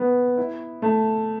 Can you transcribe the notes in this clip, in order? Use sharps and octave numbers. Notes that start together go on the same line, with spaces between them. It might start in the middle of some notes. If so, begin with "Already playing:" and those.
Already playing: B3
E4
A3